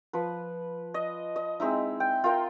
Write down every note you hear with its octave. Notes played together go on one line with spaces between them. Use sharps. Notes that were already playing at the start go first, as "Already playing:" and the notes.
F3 B4
D#5
D#5
G#3 C4 D#4 E4
G5
F4 A#4 G5